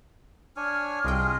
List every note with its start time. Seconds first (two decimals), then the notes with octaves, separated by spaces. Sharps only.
0.57 D4 C#5 G#5 F6
1.05 C2 F4 G#4 D#5 G5